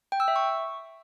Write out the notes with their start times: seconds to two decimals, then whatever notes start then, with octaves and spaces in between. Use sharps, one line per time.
0.12 G5
0.20 E6
0.28 E5
0.36 C#6